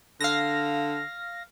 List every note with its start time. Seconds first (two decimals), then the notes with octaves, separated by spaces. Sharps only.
0.21 D3 F5 A#6